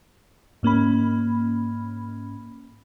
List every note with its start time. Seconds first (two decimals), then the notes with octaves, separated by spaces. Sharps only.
0.63 G#2 A#3 C#4 B5